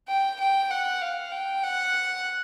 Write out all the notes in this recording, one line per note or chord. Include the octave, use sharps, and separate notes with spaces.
G5
G5
F#5
F5
G5
F#5